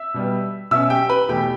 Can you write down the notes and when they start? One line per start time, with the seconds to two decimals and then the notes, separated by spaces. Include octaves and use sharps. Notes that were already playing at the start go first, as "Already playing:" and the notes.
Already playing: E5 E6
0.14 B2 G3 B3
0.71 B2 F#3 C#4 E5 E6
0.90 G4 G5
1.09 B4 B5
1.28 E2 B2 A3 G4 G5